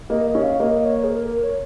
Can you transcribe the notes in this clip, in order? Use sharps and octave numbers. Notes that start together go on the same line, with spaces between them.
A#3 D#5
D#5
C#4
F5
A#3 D#5
C#5
G#4
A#4
A#4
C#5